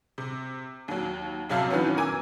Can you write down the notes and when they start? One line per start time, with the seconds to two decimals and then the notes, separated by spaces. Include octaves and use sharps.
0.18 C3
0.88 D#2 F#3
1.49 F#2 C3 F#3 E5 F5 A5
1.70 D#3 E3 F#3 B3 C#4
1.97 A#4 G#5 D6 E6